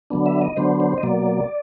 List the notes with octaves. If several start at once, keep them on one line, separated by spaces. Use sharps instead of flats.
D3 F#3 B3 D4
E5
D#5
D3 F#3 B3 D4 C5
C5
D#5
B2 F#3 A#3 D5